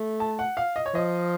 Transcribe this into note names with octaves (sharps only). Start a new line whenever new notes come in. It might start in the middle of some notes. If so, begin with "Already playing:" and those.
Already playing: A3
A5
F#5
F5
D#5
C#5
F3 D#5